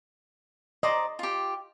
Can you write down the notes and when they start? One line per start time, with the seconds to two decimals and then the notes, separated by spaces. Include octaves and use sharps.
0.83 C5 D5 D#5 A#5
1.19 F4 G4